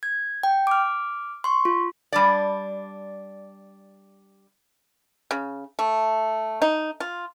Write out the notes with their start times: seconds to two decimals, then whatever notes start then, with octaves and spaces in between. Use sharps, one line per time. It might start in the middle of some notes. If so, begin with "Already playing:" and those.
0.03 G#6
0.43 G5
0.67 D6 F6
1.44 C6 C#6
1.65 F4
2.12 G3 D4 D5
5.31 C#3
5.79 A3
6.62 D#4
7.00 F4